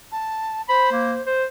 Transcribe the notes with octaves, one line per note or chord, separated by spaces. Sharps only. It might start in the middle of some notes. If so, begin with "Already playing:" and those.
A5
C5 B5
A#3
C5